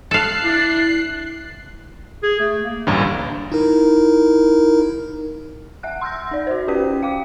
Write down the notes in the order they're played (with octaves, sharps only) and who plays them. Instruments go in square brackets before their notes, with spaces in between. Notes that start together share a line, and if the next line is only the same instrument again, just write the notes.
[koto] A4 F5 [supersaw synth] F#6 C7
[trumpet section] D4 [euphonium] E4
[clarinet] G#4
A3
A#3
[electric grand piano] A1 D2 G2
[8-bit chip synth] D#4 E4 A#4
[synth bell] E5 F#5 F#6
C6 E6 F6 G6 A#6
D#4 D5
F#4 C5
C#4 G4 B4 G5 B6
F5 G5 D6